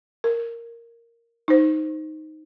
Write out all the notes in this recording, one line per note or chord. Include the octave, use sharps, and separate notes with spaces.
A#4
D#4 C5